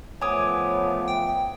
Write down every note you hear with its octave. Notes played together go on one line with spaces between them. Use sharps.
F3 A3 B3 C#5 G#5 D6 D#6
G5